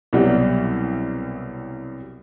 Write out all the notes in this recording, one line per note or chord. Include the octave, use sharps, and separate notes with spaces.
C2 B2 F#3 G3